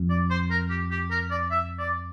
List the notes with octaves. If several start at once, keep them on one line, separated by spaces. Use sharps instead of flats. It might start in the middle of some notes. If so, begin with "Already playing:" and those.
Already playing: F2
D5
C5
A#4
G4
G4
A#4
D5
E5
D5